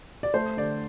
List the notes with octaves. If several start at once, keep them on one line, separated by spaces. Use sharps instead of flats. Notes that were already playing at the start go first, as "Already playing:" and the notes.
D5
A3 C5
D3 D5